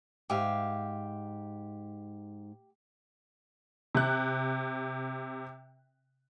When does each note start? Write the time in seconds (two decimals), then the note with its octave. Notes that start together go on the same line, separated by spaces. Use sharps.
0.30 G#2 G4 E5 F5
3.95 C3 F#6